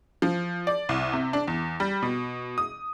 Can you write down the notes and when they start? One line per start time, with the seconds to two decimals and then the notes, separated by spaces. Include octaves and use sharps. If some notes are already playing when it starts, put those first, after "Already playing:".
0.22 F3
0.67 D5
0.89 C2
1.13 C3
1.33 D4
1.48 E2
1.80 G3
2.02 B2
2.58 D#6